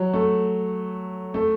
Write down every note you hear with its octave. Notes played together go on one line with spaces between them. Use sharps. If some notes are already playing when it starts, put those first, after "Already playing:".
Already playing: F#3
A3
A3